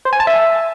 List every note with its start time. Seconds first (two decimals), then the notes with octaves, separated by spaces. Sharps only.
0.05 C5
0.13 G#5
0.20 A5
0.27 E5